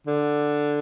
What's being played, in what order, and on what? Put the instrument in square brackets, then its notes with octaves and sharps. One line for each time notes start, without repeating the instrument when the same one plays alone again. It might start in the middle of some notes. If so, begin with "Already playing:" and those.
[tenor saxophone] D3